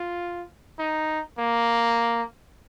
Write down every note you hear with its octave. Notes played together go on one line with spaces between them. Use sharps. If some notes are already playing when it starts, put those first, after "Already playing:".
Already playing: F4
D#4
A#3